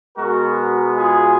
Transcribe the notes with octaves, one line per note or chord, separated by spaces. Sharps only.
B2 G#3 B3 F#4 A#4
F4 G#4